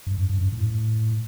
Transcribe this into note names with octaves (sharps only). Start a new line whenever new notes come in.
G2
F#2
G2
F#2
A2